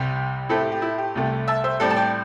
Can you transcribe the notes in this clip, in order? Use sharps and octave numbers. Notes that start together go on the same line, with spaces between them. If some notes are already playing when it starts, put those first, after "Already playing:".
Already playing: C2 C3 G3 G5 C6
A2 A3 C4 E4 A4
G4
G4
E4
G4
C2 C3 A3
E5 A5
C5 E5
A2 G3 C4 A4 D5
A5
D5 G5